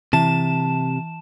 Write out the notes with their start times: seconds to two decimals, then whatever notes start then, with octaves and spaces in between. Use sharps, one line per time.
0.13 C3 E3 A5 E7